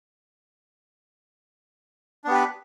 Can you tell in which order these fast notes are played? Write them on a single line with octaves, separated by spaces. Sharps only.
D4 B3 G4 B4